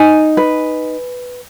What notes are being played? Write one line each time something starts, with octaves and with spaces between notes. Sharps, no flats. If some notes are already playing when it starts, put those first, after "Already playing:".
Already playing: D#4 G#5
B4